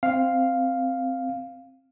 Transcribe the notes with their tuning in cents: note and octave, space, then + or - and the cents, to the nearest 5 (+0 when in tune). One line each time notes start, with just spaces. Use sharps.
C4 +0 F5 +0